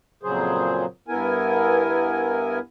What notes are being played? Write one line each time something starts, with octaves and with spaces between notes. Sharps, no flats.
F2 A#2 C#3 F#3 G#4 C5
G2 B3 E4 A#4 G#5